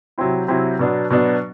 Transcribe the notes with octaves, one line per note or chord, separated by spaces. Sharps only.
C3 F#3 C4 E4
C3 F#3 C4 E4
B2 F#3 B3 D4
B2 F#3 B3 D4